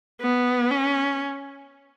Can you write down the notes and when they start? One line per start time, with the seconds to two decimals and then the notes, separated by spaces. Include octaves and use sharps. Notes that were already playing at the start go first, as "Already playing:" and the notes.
0.21 B3
0.71 C#4